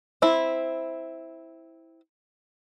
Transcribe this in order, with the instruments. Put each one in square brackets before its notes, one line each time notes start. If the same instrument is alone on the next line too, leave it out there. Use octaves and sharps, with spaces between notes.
[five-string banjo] C4 E4